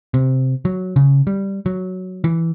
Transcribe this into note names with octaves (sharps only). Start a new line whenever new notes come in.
C3
F#3
C#3
G3
F#3
E3